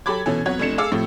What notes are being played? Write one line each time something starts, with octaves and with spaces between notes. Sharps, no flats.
F#3 G4 A4 B5 D6 G#6
B2 E3 C#4 A4 G#5
F2 F#3 B3 C#5 F#5 G#6
F1 F2 D4 C#7 E7
G#4 A4 F5 D6 E6
A2 C3 F3 A3